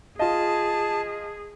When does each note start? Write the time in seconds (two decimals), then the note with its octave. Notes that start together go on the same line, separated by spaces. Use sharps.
0.19 F4 G#4 D#5 A5